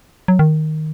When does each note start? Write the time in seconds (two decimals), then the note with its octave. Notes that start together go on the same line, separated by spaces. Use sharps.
0.28 F#3
0.39 D#3